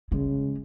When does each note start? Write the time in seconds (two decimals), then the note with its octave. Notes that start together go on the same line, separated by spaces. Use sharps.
0.12 C#3 G#3